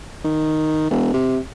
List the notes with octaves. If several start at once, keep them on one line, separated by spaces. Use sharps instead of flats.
D#3
E1
C3